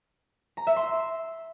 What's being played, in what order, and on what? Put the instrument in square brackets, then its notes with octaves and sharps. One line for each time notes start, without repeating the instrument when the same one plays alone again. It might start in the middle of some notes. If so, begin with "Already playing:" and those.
[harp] A#5
E5
C6